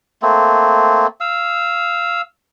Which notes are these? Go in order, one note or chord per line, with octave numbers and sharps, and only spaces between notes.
A3 A#3 C4
F5 E6